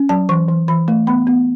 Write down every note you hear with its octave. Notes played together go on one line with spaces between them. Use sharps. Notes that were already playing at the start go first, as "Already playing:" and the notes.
Already playing: C#4
F#3 A5
E3 C#6
E3
E3 B5
A3
B3 B5
B3